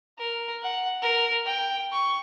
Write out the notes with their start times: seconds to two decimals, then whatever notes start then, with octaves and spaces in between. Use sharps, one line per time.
0.19 A#4
0.63 F#5
1.02 A#4
1.46 G5
1.92 C#6